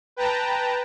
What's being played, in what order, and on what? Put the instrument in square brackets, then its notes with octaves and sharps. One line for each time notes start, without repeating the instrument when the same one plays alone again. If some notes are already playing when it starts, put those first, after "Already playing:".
[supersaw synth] B4 G5 A5 A#5